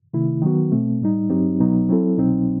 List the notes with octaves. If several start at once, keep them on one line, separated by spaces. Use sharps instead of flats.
C3 D#3 A3 E4
D#3 F#3 B3 F#4
B2 A3 C4
A2 G3 D#4
G2 F#3 C4 D#4 G4
C2 B2 F#3 B3 D#4
F#3 C4 E4 A4
C2 B2 F#3 C4 D#4